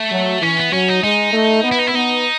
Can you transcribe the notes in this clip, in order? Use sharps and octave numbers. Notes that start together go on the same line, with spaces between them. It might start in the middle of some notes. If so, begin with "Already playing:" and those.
Already playing: A3
F#3
E3 C#4
B3
F#3 C#4
D#4
G#3 D#4
A3
B3
E4
D#4
E4
B3 D#4